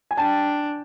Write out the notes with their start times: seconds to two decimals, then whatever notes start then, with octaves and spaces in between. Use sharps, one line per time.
0.11 G#5
0.17 D4 G5 A5